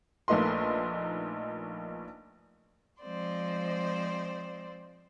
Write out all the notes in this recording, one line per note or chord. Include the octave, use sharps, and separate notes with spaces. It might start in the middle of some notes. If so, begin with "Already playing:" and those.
A#1 A3 A#3 D#4 B4 C6
F3 G#3 C4 C5 D5